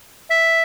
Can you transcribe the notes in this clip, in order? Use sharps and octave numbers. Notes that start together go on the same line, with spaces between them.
E5